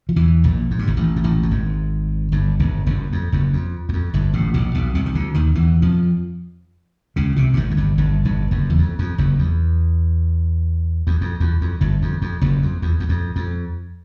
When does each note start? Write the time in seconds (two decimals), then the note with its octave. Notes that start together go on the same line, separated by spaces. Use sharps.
0.09 F3
0.16 E2 E3
0.44 A#1 A#2
0.71 G#2
0.79 G2
0.87 G#1 G#2
0.97 A1 A2
1.16 G#2
1.24 A1 A2
1.43 A2
1.51 G#1 G#2
2.32 G1 G2
2.59 G1 G2
2.86 F#1 F#2
3.13 F2
3.32 F#1 F#2
3.53 F2
3.89 E2
3.93 F2
4.14 G1 G2
4.33 A1 A2
4.54 A#1 A#2
4.74 B1 B2
4.95 C2 C3
5.06 D#3
5.14 D2 D3
5.34 D#2 D#3
5.55 E2 E3
5.82 F2 F3
7.16 C#2 C#3
7.36 C2 C3
7.53 G2
7.57 G#1 G#2
7.71 F#2
7.77 G1 G2
7.98 G1 G2
8.25 G1 G2
8.51 F#1 F#2
8.70 E2
8.78 F2
8.99 F2
9.18 F#1 F#2
9.39 E2
11.07 E2
11.21 F2
11.40 E2
11.61 F2
11.81 G1 G2
12.02 F2
12.22 F2
12.41 F#1 F#2
12.63 F2
12.82 E2
13.00 E2
13.09 F2
13.36 F2